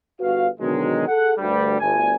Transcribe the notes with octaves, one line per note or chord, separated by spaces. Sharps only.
G1 F#4 B4 F5
B2 D3 D#3 F#3 G#3
G#4 A4 F#5
D2 G2 G3
G1 D2 G#5